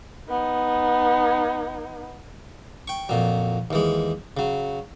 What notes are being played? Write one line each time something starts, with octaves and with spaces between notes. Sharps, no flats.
B3 D#4
G5 C#6
F2 A#2 F#3
D#2 E3 G#3
C#3 F#3